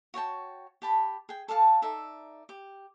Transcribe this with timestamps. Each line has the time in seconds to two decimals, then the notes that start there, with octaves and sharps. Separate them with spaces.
0.14 F#4 C#5 G5 A5
0.82 G4 A5 B5
1.29 G#4 G5
1.48 A4 D5 F5 A5
1.82 D#4 A4 D5 E5
2.49 G4